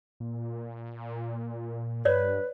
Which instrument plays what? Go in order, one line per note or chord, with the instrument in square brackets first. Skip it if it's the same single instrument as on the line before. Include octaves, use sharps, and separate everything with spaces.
[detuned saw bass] A#2
[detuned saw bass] G2 [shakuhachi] B4 [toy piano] C#5 D5